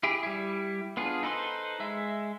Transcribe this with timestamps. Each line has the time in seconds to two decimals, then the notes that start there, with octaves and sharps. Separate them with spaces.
0.03 E4 G4 G#4
0.23 G3 E4
0.97 B3 D4 F4 G#4
1.23 D#4 A4 B4 C5 C6
1.80 G#3 E5